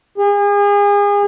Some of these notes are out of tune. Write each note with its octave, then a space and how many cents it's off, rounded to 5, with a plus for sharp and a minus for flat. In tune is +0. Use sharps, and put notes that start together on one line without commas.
G#4 -35